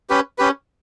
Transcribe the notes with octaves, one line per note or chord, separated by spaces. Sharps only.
C#4 G4 B4
C#4 G4 B4